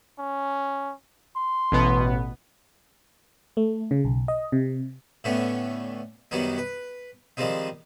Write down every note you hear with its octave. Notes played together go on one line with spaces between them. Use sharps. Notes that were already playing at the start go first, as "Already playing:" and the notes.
C#4
C6
A1 B2 B3
A3
C#3
B1
D#5
C3
A2 D3 A3 B3 C#4
F#2 D#3 F#3 G3 B3 D#4
B4
D#3 F3 G3 G#3 C4 D#4